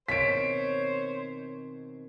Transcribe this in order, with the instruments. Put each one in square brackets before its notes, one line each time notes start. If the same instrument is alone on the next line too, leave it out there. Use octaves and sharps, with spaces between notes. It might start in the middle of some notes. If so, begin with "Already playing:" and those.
[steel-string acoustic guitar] B2 D#3 C4 [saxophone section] C5 C#5 [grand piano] B6 D7